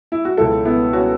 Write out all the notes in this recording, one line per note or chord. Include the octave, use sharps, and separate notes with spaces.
E4
F#4
C#2 B2 F#3 E4 A4
B3 E4
C#4 F#4